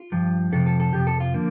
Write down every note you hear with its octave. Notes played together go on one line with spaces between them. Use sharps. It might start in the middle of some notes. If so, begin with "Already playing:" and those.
Already playing: F4
G2 F3
F2 C3 F3 A4
A4
A4
F2 C3 F3 G4
A4
F4
D3 F3 A#3